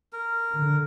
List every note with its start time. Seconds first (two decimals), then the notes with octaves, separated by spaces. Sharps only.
0.13 A#4
0.55 D3